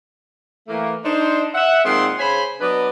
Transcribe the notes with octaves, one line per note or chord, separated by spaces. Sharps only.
E3 A3 A#3
D4 D#4 C5
E5 F#5
A#2 D#3 G#3 C4 F#5 C6
C#3 C5 C#5 G#5 B5
F#3 B3 D4 B4 D5 D#5